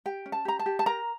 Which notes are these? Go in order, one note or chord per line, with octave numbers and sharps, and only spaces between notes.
G4 G5
C#4
A5
G4 A#5
A5
G4
A5
A#4 A#5